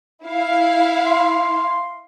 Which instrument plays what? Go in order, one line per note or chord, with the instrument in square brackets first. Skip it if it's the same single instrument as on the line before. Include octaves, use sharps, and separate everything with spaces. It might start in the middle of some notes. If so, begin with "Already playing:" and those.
[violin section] E4 F5
[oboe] C6